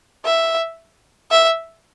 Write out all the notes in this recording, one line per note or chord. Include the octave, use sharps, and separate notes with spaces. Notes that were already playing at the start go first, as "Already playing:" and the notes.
E5
E5